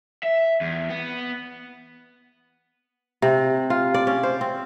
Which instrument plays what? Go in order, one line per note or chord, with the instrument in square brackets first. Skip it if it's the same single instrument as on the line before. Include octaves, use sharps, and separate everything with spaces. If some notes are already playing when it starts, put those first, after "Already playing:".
[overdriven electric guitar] E5
E2
B3
[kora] C3
F4
D5
C#4
C5
C4